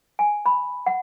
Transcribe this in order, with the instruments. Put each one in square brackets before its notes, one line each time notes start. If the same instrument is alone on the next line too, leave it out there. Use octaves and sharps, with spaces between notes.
[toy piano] G#5
B5
F#5